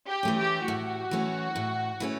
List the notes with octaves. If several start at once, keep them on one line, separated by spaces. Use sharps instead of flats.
G4
E3 A3 C#4
G4
A2 F#4
E3 A3 C#4
A2
E3 A3 C#4